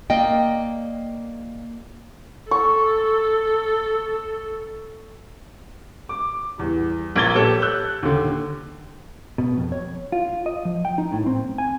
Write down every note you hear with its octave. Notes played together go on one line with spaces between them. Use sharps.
A#3 D5 D#5 G5
A4 C#6
D6
E2 G3
A#1 A#3 G#6 A6 G7
G4 A4 C#5
E6 F#6 G6
D#2 D3
B2
F2
C#5
F4
D#5
F3
G5
D#4
A2
C4
G#5